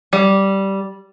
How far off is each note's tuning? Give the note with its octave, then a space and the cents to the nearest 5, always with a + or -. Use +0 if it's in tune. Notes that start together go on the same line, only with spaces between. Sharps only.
G3 -10